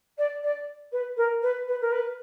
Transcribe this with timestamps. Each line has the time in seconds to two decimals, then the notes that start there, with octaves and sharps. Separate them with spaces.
0.18 D5
0.43 D5
0.92 B4
1.17 A#4
1.42 B4
1.67 B4
1.81 A#4
1.91 B4